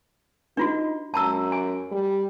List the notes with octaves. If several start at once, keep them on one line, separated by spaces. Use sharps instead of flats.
D4 D#4 F4 F#4
F#2 A5 A#5 E6
G#5
G3